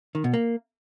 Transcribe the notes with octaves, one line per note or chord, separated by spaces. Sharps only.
D#3
B2
A#3